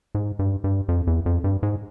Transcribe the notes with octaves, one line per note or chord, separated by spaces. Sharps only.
G#2
G2
G2
F2
E2
F2
G2
G#2